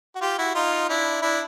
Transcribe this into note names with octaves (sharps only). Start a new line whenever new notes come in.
F#4
F4 G4
E4 F#4
D#4 F4
D4 E4
D4 E4